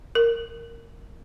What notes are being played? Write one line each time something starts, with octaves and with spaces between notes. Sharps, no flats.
A#4